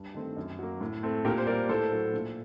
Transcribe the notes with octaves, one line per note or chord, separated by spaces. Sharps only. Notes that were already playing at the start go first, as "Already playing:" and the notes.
Already playing: G2
D#3 A3 C4
F#2
F#3 A#3
A2
A3 C4
A#2 G4 A#4
C5
G3 A#3 A#4 D5
A2 A4 C5
F#3 A3
A#2